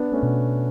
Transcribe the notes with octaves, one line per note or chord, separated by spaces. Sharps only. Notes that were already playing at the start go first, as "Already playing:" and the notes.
Already playing: B3 D4
A3 C#4
B2